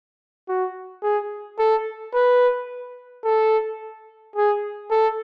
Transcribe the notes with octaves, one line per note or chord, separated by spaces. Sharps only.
F#4
G#4
A4
B4
A4
G#4
A4